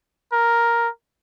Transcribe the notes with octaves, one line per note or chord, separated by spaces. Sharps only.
A#4